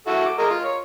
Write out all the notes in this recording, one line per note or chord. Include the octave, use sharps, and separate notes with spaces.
E4 F#4 A4
D6
G#3 A#4 D#5
F4
C#5